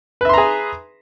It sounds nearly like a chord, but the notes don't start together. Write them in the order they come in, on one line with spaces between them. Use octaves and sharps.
B4 E5 C6 A#5 G#4